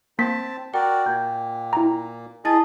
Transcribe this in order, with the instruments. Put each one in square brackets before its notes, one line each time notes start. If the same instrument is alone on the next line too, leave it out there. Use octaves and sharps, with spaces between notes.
[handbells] A#3 B6 [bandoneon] C4 A5
[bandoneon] F#4 A#4 D5 [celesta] G5
[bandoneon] A#2 A#3 [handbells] G6 G#6
[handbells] E4 A#5
[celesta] E4 A5 A6 [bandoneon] G#4 D#5